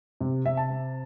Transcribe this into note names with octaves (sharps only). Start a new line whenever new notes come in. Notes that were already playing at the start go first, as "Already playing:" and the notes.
C3
C3 E5
A5
C4